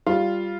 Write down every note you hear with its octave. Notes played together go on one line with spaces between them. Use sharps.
G3 F4